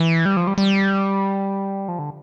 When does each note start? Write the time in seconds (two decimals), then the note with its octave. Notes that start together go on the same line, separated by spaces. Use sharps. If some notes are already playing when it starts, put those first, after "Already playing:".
Already playing: E3
0.25 G3
0.37 F3
0.47 G3
0.58 G3
1.88 F3
1.99 D3